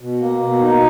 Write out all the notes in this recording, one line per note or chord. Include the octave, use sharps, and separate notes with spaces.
B2
A#3
B2
D#4